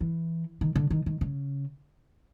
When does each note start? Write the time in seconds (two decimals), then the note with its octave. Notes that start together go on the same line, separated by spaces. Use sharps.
0.01 E3
0.61 D#3
0.76 D3
0.91 D#3
1.06 D#3
1.21 C#3